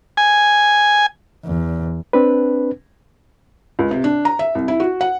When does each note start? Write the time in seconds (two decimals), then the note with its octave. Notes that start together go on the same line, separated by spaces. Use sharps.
0.17 G#5
1.45 E2
2.13 C4 D4 B4
3.79 C#2
3.91 C3
4.04 D4
4.25 A#5
4.39 E5
4.55 C2
4.68 E4
4.80 F#4
5.01 F#5